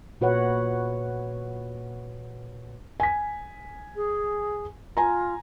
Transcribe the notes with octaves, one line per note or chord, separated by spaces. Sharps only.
A#2 F#4 B4 C#5 F#5
G#5 B6
G#4
F4 G#5 A#5